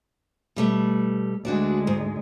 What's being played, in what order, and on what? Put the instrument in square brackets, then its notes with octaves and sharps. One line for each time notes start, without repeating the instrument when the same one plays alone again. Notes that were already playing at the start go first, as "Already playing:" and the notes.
[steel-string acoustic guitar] B2 G3 A3
[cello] D2 G#3 [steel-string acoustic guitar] D4 F#4 D5
[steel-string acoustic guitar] G#2